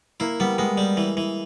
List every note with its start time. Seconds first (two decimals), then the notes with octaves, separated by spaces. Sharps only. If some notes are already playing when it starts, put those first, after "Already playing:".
0.20 A#3 E4
0.40 G3 B3
0.58 G#3 B3
0.77 G3
0.97 E3
1.17 E3